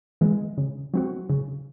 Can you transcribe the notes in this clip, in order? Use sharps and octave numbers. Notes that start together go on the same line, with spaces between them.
E3 G#3
C#3
F#3 C4 F#4
C#3